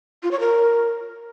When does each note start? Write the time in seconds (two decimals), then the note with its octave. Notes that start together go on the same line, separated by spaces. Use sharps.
0.23 F4
0.31 C#5
0.40 A#4